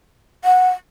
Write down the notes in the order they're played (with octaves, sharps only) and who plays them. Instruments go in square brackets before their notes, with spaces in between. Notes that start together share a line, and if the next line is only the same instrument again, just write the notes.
[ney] F#5